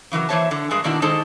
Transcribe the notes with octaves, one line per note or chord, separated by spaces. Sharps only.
C#3 E3 F#3 A#4
E3 A#3 C5 C#5 E5 A5
D3
G2 G#3 G#4 A#4
B2 D#3 A#3 D4 E4 F#4
D#3 G#3 D#4 A4 C5 A5